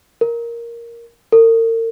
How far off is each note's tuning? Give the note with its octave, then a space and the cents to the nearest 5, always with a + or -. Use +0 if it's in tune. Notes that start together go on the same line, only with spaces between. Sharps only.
A#4 +5
A#4 -40